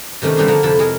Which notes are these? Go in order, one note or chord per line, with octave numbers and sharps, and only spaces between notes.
C3 D#3 A3 C#4 D4
C#3 G3 B3 D4 D#4 C5
D3 F3 A#3 A#4 F#5
F2 C3 E4 A4 B4
G#3 G#4 A#4